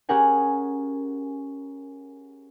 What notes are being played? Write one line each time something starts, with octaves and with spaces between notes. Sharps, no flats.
C#4 G4 G#4 A#4 F#5 G#5